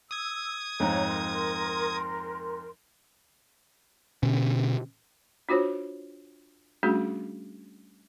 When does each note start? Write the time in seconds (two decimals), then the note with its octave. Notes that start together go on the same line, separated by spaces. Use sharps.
0.11 D#6 E6 G#6
0.80 F2 G#2 C#5 F5 A#5
1.08 A#4 C6
4.23 B2 D3 C#4
5.49 D4 F4 F#4 C5 C#5
6.83 G3 A3 C#4 D4 F#4 G#4